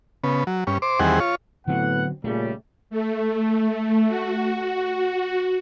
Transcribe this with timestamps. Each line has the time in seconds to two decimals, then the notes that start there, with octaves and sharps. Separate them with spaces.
0.24 C#3 B3
0.47 F#3
0.67 G2 C#4
0.82 C5 D6
0.99 E2 D#3 G3 C4 G#4 F#5
1.20 F4 C#5
1.68 A2 D3 F#3 B3 C4 F#5
2.24 A#2 C#3 G3 A3
2.90 A3
4.07 F#4